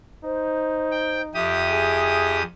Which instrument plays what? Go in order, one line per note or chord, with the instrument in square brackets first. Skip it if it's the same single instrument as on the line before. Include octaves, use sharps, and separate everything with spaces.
[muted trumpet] D#4 [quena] C5
[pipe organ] G5
[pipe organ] F2 G4 D#6 [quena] E5
[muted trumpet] G#4